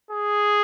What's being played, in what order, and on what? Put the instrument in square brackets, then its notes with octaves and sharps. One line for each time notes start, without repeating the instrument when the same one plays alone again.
[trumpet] G#4